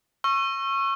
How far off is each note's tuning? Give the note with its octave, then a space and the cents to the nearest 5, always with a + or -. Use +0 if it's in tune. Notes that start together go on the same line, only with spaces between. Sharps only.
C#6 -20 E6 +40